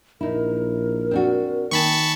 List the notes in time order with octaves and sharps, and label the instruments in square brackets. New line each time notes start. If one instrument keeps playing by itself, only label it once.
[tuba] A#1 [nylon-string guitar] D#4 E4 [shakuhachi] A#4
[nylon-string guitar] C4 D4 F#4
[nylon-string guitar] D#3 G#5 [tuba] A#3 [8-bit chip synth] A5 B5 C#6